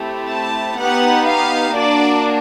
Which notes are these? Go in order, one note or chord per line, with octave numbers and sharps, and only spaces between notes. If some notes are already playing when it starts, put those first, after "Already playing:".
Already playing: A3 C4 E4 G4
A5
B3 D#4 G4 F#5
F5
A#3 D4 F#4 D5